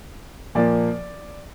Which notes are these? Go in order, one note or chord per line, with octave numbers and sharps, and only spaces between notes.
A#2 F3 A#3 D5